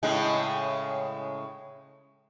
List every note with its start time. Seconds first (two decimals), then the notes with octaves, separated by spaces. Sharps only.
0.03 A2 C#3 G#3